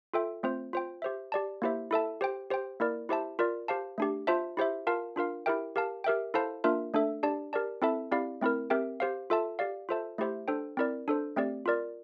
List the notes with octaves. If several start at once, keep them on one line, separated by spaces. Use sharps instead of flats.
F4 A4 E5 G5
A3 C4 F4 C5
F4 C5 G5
G4 C5 E5
G4 D5 A5
A#3 E4 G4 C5 E5
E4 A4 E5 A5
G4 C5 G5
G4 C5 G5
A#3 E4 A#4 D5
E4 G4 C5 E5 A5
F4 A#4 D5
G4 C5 F5 A5
A3 D4 G4
F4 C5 E5 A5
E4 G4 C5 E5
F4 A#4 F5 A5
D4 F4 A#4 F5
E4 G4 A#4 E5 G5
G4 A#4 F5 A5
G4 A#4 E5 G5
E4 A4 C5 F5 A5
A#3 D4 F4 A#4 E5
A3 D4 A4 E5
D4 G4 D5 A5
G4 A#4 D5 A5
C4 E4 A4 E5 A5
C4 E4 G4 D5 F5
A3 C4 E4 A#4
C4 G4 A#4 E5 G5
G4 C5 F5
F4 A4 E5 A5
G4 D5 F5
F4 A4 C5 E5 A5
A3 E4 G4 C5 E5
D4 A4 C5 G5
C4 E4 A#4 D5
D4 A4 C5
A3 C4 G4 D5
F4 A#4 D5